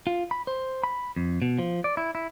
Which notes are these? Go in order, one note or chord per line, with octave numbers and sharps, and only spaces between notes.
F4
B5
C5
B5
F2
B2
F3
D5
E4
E4